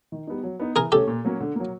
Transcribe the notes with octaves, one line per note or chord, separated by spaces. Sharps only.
D#3
G3 B3 D#4
F#3
B3 D#4
E3 G#4 A#4
A3 C#4 G4 A4
A#2
F#3 A#3 C#4
D3
F#3 A#3